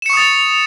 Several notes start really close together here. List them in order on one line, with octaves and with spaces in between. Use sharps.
E7 C#7 C#6 D#6 A6